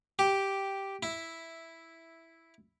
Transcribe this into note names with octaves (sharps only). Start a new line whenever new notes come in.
G4
E4